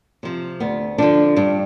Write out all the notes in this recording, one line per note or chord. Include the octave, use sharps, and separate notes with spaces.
C3 F3
D2 B3
D3 F3 D4
G2 D4